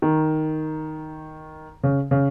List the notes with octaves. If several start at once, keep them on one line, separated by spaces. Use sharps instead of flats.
D#3
C#3
C#3